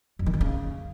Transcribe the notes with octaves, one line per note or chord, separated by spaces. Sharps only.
F2
D#3
D3
C#3